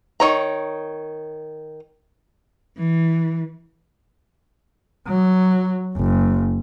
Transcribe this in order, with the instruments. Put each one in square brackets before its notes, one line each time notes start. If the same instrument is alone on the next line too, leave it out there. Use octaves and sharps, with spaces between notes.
[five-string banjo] D#3 C#5 A#5
[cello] E3
[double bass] F#3
F#1